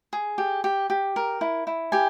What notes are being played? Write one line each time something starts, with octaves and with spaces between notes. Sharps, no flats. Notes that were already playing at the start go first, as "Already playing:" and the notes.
G#4
G4
G4
G4
A#4
E4
E4
G4 G#5